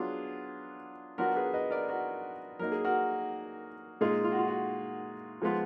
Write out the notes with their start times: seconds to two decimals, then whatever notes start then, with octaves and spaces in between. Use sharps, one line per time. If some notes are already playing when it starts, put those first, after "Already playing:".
Already playing: F#3 B3 D4 F4 G#4
1.18 F#3 B3 D4 F4 F#4 A#4
1.36 G#4 B4
1.54 B4 D#5
1.71 A#4 D5
1.89 F#4 A#4
2.59 F#3 A#3 D#4 A#4
2.72 G#4
2.85 F#4 A#4
4.01 A#2 G#3 D#4 F4 G#4
4.24 F4
4.32 F#4
4.38 F4
4.48 F#4
5.42 F3 G#3 B3 F4